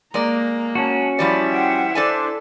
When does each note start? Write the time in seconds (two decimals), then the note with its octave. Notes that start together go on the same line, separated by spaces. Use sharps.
0.14 G#3 A#3 D5 A#5
0.75 C#4 F#4 A5
1.19 F3 G3 E4 D5 E5 B5 D6
1.50 C5 F#5 G5
1.95 D4 A4 C5 D5 G#5